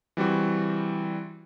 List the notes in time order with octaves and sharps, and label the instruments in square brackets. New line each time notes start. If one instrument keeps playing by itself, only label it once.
[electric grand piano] E3 G3 C4 F#4